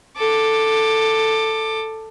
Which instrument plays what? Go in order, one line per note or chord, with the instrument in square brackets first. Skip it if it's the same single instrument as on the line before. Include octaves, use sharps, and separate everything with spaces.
[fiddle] A4 D6